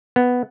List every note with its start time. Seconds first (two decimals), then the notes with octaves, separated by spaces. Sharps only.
0.16 B3